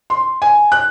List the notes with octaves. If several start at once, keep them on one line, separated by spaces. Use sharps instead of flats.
C6
G#5
F#6